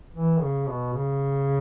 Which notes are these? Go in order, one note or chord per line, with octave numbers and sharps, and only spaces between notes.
E3
C#3
B2
C#3